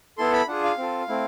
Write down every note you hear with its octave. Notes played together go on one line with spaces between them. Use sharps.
B3 E4 A4 C6
B5
D4 F4 G#4 F#5
F5
C4 F4 A4
A3 C4 E4